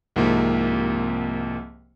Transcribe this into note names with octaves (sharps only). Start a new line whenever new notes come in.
C2 G#2 C3 F3 A#3